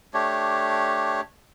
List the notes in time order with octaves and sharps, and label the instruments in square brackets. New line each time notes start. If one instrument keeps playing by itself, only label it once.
[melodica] A3 D4 G4 C#5